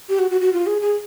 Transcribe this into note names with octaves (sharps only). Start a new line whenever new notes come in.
G4
F#4
F#4
F#4
F4
G#4
G#4